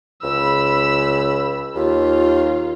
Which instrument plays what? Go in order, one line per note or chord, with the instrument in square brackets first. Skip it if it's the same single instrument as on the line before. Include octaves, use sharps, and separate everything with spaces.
[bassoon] C#2 [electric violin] B5 E6
[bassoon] D#2 [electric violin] F4